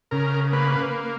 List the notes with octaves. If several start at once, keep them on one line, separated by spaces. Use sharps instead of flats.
C#3 A#4
A#3 B4